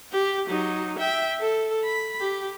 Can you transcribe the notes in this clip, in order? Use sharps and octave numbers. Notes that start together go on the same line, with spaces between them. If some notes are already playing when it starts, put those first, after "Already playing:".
G4
F#3 D#4
E5 G5
A4
B5
G4